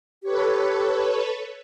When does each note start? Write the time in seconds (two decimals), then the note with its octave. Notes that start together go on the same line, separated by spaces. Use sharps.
0.23 G4 A4 B4 C#5